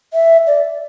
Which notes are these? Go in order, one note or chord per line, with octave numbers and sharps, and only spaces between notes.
E5
D5